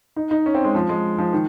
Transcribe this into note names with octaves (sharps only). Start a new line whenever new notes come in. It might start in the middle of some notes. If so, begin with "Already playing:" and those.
D#4
D#4
C#4
C4
G#3
F3
G#3
F3
D#3